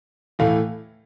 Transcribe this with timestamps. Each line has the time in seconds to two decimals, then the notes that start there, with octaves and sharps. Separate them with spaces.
0.39 A2 E3 A3 F5